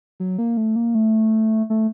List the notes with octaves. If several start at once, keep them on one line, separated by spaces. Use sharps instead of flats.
F#3
A#3
A3
A#3
A3
A3